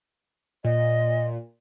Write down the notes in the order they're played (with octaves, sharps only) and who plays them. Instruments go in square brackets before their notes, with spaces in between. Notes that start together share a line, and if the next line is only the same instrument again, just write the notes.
[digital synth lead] A#2 [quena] D#5